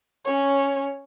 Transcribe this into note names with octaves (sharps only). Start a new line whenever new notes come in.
C#4 C#5